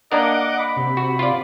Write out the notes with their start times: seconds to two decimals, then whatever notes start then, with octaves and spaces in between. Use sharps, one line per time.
0.12 A#3 D4 A#4 D#5 F#5 D6
0.59 B5
0.76 C3
0.97 F#4
1.19 F4 D5